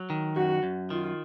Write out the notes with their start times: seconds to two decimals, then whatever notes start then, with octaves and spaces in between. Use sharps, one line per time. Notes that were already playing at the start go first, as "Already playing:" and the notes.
Already playing: F#3
0.10 D#3
0.36 F#2 F#4
0.63 F#2
0.90 D#3 F4